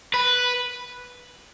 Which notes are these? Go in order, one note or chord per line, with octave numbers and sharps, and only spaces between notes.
B4